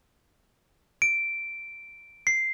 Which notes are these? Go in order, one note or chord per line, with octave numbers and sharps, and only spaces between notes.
D7
C7